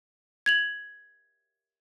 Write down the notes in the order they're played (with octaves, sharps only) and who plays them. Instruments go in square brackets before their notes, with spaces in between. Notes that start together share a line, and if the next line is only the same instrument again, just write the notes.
[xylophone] G#6 F7 F#7